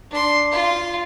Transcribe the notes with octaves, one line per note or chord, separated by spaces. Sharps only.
D4 C6
F4